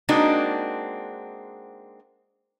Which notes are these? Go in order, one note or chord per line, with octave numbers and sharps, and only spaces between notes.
G#3 A#3 C4 D4 D#4 F#4